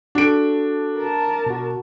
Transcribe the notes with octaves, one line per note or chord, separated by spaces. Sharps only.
D4 F#4 A4 D7
A#4 A5
B2 F#4